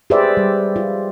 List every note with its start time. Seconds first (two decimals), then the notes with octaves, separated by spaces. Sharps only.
0.10 G4 G#4 B4 C5 D5 E5
0.37 G3
0.76 F4